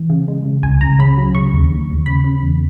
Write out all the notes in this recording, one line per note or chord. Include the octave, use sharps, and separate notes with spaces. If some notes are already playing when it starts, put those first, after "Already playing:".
Already playing: E3
C#3
G#3
C#3
C#2 G#5
C#2 A#5
C#3 B5
F#3
C#3 C#6
D#2
D#2
D#2
C#3 B5
C#3
E2